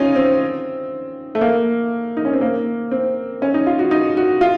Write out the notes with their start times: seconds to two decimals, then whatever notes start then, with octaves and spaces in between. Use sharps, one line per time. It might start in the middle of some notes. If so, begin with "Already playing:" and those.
Already playing: C#4 D#4 F4
0.16 C4
1.35 A3
1.41 A#3
2.17 D#4
2.25 C#4
2.33 C4
2.41 A#3
2.91 C4
3.42 C#4
3.54 D#4
3.67 F4
3.79 F#4
3.91 D#4
4.17 F#4
4.41 F4